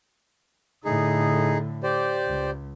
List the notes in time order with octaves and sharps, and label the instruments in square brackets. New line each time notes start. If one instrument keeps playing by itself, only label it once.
[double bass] A2 D3 [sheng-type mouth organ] D#4 G#4
[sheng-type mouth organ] G4 C5 D5
[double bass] C#2